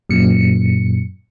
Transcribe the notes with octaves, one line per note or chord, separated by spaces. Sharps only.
F#2 A#2 C#7